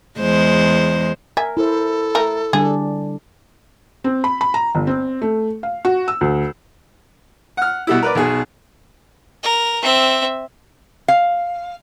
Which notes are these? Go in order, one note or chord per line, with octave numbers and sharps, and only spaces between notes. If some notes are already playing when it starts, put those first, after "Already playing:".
E2 G#3 C5
A#4 E5 G#5
E4 A4 C5
A3 A#4
D3 G3 D4 G#4
C4
B5
B5
A#5
G1
C4
A3
F5
F#4
E6
D2
F#5 F6
B2 G3 E4
A#4 B4 D5
B1 B2 G#4
A#4
C4 E5
F5